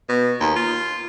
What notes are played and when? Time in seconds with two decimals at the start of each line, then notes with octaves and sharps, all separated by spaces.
0.09 B2
0.40 D#2
0.56 F4